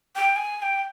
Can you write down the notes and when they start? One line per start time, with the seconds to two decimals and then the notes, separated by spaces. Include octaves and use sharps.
0.16 G5
0.36 G#5
0.58 G#5
0.62 G5